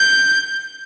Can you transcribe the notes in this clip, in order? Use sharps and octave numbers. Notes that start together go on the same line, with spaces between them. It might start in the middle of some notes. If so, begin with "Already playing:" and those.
Already playing: G6